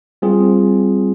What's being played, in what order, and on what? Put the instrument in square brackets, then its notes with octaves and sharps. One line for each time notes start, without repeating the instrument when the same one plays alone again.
[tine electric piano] G3 C4 F4 G#4